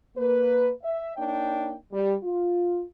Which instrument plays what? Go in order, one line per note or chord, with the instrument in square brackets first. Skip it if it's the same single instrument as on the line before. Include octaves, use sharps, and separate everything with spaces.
[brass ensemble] A#3 B4
E5
A#3 D4 D#4 C#5 G5
G3
F4